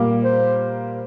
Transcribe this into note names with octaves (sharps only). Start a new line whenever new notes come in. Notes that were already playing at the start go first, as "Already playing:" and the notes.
Already playing: A#2 G3 A#3 G4
C5